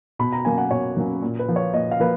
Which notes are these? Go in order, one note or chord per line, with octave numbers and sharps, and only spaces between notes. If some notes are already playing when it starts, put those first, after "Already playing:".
B2 B5
A#5
F#3 A#3 C#4 G#5
F#5
B2 C#5
F#3 A#3 C#4
A#2
B4
F3 A#3
C#5
A#2 D#5
F5
F3 A#3 B4